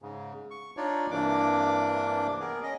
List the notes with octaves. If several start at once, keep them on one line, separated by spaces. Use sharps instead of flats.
G#2 C#3
C#6
D4 D#4 F4 C#5 D5
G2 C3 E3 A#3 D4 D6
B3 G#4 A#4
C#4 D#5